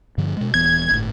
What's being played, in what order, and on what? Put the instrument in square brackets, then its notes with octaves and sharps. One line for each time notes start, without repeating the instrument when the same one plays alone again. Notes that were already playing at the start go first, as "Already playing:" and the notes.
[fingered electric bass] G2 D3 F3
B2 G#3
[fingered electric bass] D#1 E3 B3 [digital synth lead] G#6
[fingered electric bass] G1 A2